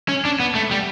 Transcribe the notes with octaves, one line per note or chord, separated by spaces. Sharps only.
C#4
D4
B3
A3
G3